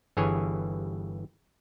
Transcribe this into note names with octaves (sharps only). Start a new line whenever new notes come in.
G1 G2 E3 G#4 C#5 G#5